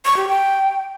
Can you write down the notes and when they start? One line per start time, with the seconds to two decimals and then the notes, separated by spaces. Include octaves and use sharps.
0.05 C#6
0.17 G4
0.28 G5